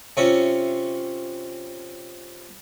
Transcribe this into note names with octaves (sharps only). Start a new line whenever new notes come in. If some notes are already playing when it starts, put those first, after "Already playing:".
C3 C#4 F4 E5